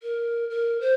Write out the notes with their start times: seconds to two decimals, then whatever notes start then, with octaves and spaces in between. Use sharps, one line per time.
0.03 A#4
0.50 A#4
0.81 C5